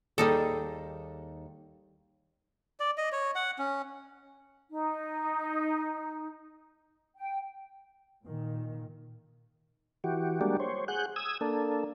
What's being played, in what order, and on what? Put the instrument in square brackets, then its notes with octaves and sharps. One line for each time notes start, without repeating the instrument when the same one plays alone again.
[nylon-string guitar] D#2 G#4 [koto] G3 D#4 A4
[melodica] D5
D#5
C#5
F#5
C#4
[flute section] D#4
G5
[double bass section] A#2 D#3
[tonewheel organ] E3 F#4 G4
G3 G#3 A#3 D4 F#4 G4
C5 C#5
G#4 F#5 F#6 G6
D#6 E6 G#6
A#3 D4 A4